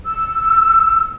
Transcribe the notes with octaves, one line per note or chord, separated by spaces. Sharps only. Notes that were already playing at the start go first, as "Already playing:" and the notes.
E6